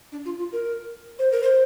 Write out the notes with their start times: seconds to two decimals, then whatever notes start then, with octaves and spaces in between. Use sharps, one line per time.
0.12 D4
0.25 F4
0.39 F4
0.53 A#4
1.19 C5
1.32 A#4
1.43 C5